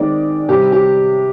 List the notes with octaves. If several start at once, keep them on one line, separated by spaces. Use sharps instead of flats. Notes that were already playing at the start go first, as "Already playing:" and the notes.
Already playing: D#3 G#3 C4 D5
C3 G3 C4 G4
G4